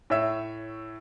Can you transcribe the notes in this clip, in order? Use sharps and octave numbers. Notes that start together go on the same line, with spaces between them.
A2 C#5 E5 E6